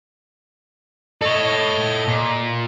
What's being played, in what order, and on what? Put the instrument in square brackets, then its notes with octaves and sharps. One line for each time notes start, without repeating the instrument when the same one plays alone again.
[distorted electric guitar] A4 C#5 [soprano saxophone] D#5
[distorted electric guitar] A#2